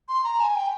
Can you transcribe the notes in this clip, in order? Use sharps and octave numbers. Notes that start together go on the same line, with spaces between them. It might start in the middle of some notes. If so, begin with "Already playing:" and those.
C6
A#5
G#5
G5